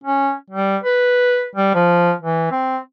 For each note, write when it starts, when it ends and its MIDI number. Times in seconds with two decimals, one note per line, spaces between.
0.04 0.33 61
0.50 0.77 55
0.84 1.47 71
1.55 1.71 55
1.75 2.13 53
2.22 2.50 52
2.51 2.78 60